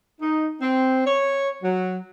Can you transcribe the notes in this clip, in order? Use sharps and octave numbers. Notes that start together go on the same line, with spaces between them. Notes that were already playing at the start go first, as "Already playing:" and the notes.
D#4
C4
C#5
F#3